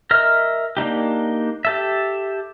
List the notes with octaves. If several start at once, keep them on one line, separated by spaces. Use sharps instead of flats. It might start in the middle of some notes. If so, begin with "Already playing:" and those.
A#4 D#5 E5 F6
A#3 D4 D#4 G4
G4 A4 E5